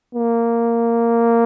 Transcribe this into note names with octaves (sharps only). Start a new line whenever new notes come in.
A#3